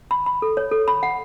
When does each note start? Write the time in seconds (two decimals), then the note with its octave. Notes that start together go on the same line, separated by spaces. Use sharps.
0.11 B5
0.26 B5
0.42 A4
0.57 C#5
0.72 A4
0.88 B5
1.03 F#5